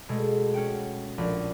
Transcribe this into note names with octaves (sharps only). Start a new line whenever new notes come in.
B2 G#3 A3
C#4 F#5 G5
A#1